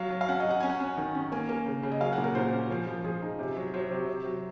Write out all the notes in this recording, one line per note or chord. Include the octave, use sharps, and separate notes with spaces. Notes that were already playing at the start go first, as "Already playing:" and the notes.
Already playing: F#3 F5
F#3
F5
C#4 F#5
F#3 D#5
F#5
C#4 G#5
F#5
C#4
D#3
C#4
A#3 G#5
A#3
C#3
C#3
D#5
F#3 F5
F#5
A#2
A#4
A#2 C5
C#4
F3
F3
F3 G#4
D#4
C3
F#3
F#3 C5
C3
C3
F#3